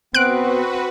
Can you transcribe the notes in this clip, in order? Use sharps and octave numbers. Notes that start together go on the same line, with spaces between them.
B3 C4 F#4 B4 F#6 D7